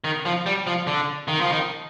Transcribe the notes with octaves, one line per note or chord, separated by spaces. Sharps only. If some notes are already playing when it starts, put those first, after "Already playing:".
D#3
F3
G3
F3
D3
D#3
F3
D#3